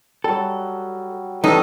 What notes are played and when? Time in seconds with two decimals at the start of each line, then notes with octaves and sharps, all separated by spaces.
0.24 F#3 G3 A4
1.44 A2 E3 G3 C#4 D#4 A4